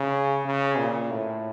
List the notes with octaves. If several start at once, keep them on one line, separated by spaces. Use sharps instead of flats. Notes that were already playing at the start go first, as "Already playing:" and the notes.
Already playing: C#3
C#3
A#2
A2